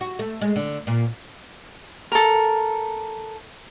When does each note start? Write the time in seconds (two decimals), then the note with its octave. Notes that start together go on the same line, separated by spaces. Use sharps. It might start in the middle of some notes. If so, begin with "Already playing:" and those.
0.01 F#4
0.19 A3
0.41 G#3
0.56 D3
0.87 A#2
2.12 A4 A#4